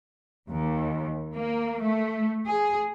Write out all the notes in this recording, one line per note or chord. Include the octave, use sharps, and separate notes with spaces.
D#2
A#3
A3
G#4